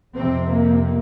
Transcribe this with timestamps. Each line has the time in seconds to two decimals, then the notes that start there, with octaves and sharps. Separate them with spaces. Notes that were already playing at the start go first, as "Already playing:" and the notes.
0.15 F2 C3 C4
0.51 A#3